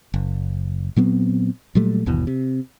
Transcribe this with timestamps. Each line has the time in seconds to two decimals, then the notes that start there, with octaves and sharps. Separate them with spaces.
0.14 F#1
0.96 A#2 F#3 B3 C4
1.75 A#2 F#3 G3 A3
2.06 G1 D#2 B2 E3
2.27 C3